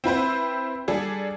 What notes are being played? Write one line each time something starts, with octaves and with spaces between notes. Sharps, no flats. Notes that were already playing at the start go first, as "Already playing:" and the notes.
C4 E4 B4 C5
G3 D4 G#4 A4